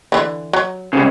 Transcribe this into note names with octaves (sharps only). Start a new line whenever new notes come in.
D3 E3
F#3
C2 G#2 C#3